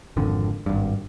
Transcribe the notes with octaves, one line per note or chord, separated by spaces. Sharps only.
G#1 F2 D3
G#1 G2